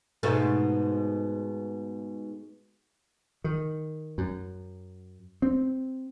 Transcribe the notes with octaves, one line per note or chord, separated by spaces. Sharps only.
G#2 B2 A3
D#3
F#2
C4